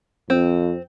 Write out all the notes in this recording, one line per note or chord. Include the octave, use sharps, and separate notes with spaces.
F2 C4